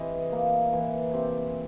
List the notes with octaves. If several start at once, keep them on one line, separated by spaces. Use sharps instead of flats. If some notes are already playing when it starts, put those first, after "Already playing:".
Already playing: C3 E3 D#5
A#3
E3
C3